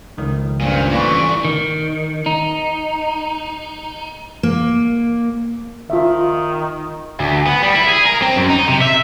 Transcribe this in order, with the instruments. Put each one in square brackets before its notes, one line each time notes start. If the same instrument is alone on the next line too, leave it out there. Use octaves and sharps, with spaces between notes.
[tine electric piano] C#2 D#3 F3
[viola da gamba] G2 C#4 C5 [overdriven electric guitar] A#2
[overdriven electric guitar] A2 E3 [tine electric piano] F4 B4 [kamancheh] D5 C#6
[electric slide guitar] D#3
D#4
[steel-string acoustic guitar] A#3
[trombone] D#3 [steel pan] F4 E5
[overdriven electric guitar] D2
B3
G3
E4
G#4
A#4
C4
F#2
D#4
C3
E5